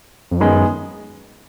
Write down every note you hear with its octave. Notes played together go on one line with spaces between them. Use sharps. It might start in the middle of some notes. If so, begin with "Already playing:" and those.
F2
F#2 D#3 G#3 B3